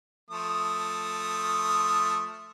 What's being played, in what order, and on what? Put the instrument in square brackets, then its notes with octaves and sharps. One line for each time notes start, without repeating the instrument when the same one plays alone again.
[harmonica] F3 A3 D#6